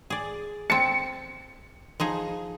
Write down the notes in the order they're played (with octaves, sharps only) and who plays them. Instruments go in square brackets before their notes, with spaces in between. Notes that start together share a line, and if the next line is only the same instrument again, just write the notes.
[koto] G#4 D5
[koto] C4 A5 [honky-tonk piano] C#7
[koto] F3 D#4 G#4